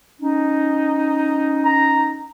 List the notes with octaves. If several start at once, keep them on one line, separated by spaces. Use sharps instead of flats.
C#4 D#4
A#5